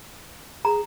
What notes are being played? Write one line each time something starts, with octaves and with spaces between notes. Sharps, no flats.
G#4 A#5